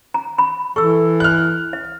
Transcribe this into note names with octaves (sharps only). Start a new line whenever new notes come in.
A#5
B5
E3 A4 C#6 E6
F6 F#6
E5